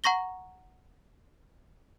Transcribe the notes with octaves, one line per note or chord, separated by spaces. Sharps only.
F#5 A#5 C#6 A#6 G7